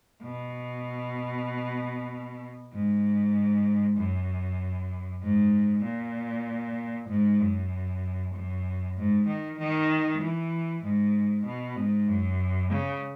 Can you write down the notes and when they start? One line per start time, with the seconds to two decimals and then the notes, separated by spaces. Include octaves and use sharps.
0.23 B2
2.73 G#2
3.97 F#2
5.23 G#2
5.84 A#2
7.09 G#2
7.40 F#2
8.34 F#2
8.96 G#2
9.27 D#3
9.59 D#3
10.21 E3
10.84 G#2
11.46 B2
11.76 G#2
12.08 F#2
12.70 C#3